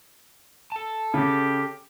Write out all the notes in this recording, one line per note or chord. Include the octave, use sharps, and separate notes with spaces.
A4 A5
C#3 G4